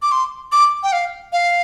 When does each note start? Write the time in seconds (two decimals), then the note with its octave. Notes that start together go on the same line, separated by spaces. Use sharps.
0.02 D6
0.12 C6
0.52 D6
0.83 G5
0.92 F5
1.33 F5